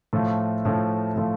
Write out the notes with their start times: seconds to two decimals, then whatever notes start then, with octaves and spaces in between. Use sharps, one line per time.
0.13 A2 F3 A3 F4
0.65 A2 F3 A3 F4
1.16 A2 F3 A3 F4